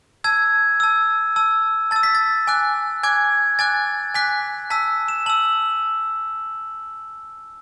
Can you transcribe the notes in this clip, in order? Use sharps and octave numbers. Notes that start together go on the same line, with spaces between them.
A5 E6 G#6
A5 E6
A5 E6
A5 E6 A6
B6
A6
G#5 D6 F#6
G#5 D6 F#6 G#6
G#5 D6 F#6 A6
G#5 D6 F#6 B6
A5 E6 B6
E7
A5 E6 F#7